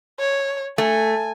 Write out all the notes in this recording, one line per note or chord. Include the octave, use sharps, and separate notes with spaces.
C#5
A3 G#5